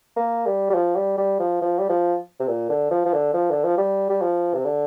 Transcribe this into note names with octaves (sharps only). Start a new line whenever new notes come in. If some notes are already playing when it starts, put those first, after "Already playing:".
A#3
G3
G3
F3
G3
G3
F3
F3
G3
F3
C3
A#2
D3
F3
F3
D3
F3
D3
F3
G3
G3
F3
C3
D3